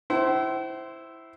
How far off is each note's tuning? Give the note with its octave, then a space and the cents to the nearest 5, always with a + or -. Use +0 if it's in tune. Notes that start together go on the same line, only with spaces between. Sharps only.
E4 +0 C5 -5 G5 -45